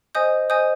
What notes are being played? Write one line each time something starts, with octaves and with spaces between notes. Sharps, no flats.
C5 D#5 G#5 D#6 G6
C5 D#5 G#5 D#6 G6